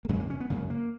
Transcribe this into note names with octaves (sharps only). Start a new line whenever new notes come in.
A#3
F2 C#3 G#3
A#3
C#4
B3
F#2 C#3 A#3
A#3